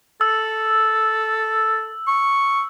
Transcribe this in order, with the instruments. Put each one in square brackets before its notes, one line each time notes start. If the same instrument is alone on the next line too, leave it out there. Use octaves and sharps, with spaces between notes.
[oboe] A4 [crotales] E6
[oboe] C#6